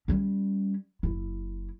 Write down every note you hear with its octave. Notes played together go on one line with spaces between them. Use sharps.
G3 C#4
F#1 E4